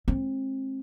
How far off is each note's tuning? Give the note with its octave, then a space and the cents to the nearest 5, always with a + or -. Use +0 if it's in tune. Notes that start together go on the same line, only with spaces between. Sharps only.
G#3 +35 C4 +35